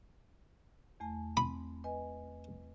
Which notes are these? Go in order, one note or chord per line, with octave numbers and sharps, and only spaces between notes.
E2 A3 G#5
C4 B5
B4 D#5 G#5